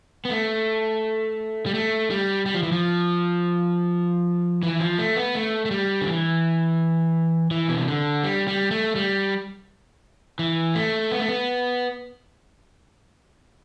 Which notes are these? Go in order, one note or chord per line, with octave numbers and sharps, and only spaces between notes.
B3
A3
G3
A3
G3
G3
F3
E3
F3
E3
F3
A3
B3
A3
A3
G3
D3
E3
E3
B2
C3
D3
G3
G3
A3
G3
E3
A3
B3
A3
B3